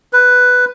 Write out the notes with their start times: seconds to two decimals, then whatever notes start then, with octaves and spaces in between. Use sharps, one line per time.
0.13 B4